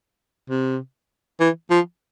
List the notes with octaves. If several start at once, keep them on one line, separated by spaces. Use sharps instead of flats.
C3
E3
F3